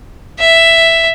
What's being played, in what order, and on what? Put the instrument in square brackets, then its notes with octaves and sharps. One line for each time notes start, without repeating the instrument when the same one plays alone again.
[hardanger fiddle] E5